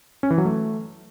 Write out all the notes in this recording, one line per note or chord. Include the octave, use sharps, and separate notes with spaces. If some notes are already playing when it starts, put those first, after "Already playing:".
C#4
E3
F#3
A3